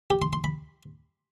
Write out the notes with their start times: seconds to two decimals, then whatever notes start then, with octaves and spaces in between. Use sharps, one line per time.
0.10 G4
0.22 C6
0.33 C6
0.44 B5